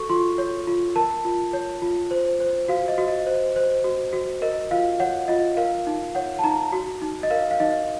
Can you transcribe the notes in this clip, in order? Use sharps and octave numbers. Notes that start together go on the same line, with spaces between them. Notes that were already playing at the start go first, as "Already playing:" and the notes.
Already playing: F#4 A4 C#6
F4 C6
C#5
F4
A#4 A5
F4
C#5
F4
C5
C5
F#4 F5
D#5
F#4
D#5
C5
C5
F#4
F#4
A#4 D#5
F4 F5
C#5 F#5
F4 D#5
A#4 F5
D#4
C#5 F#5
A5
D#4 A#5
F#4
D#4
D#5
A#4 F5
F5
D#4 D#5